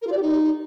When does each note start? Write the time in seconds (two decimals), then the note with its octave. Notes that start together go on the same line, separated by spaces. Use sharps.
0.01 A#4
0.06 F4
0.11 D5
0.17 G4
0.22 D#4